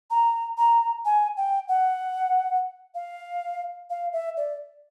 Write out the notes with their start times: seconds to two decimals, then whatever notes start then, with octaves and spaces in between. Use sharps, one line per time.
0.10 A#5
0.58 A#5
1.05 G#5
1.37 G5
1.68 F#5
2.95 F5
3.90 F5
4.13 E5
4.37 D5